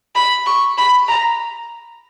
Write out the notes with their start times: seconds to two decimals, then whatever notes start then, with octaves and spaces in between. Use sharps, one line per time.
0.16 B5
0.46 C#6
0.78 B5
1.09 A#5